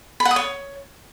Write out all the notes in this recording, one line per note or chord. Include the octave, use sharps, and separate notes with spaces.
B5
F#5
D#6
C#5